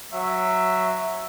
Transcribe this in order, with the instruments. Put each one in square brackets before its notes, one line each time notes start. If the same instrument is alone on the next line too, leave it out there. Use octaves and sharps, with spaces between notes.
[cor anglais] F#3 [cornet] E5